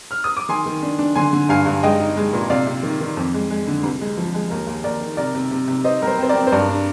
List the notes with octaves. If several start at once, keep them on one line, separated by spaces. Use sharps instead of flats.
F6
D#6
D6
D#3 G#5 C6
D#3
D4
D4
D3 G#5 C6
D3
G2 F5 G#5
G2
G#3 D#5 G5
D#4
G#3
A#2
C3 D5 F5
C3
D#3
D#3
F2
G#3
G#3
D3
C2
G#3
F3
G#3
D#2 A#4
D#2
D#2 A#4 D5
D#3
C3 A#4 D5
C3
C3
C3
D#4 C5 D#5
G3 A#4
C5
C4 C5
A#4 D5
C4
C5
G2 A#4 D5
D4